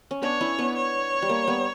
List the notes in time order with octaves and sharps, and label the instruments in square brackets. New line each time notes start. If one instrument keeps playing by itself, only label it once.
[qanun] C#4
[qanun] B3 D4 [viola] C#5
[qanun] C#4 E4
B3 D4
[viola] C#5
[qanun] G3
A#3
G3 B3